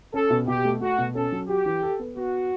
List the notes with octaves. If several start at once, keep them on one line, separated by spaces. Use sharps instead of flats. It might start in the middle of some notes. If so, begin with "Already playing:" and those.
C#4 A4
B2
B2 G4
A3
A3 F#4
B2
C#4 A4
F#3
F#4 G4
E3
A4
B3
B3 F#4